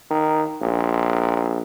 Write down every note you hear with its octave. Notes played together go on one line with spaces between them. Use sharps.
D#3
A#1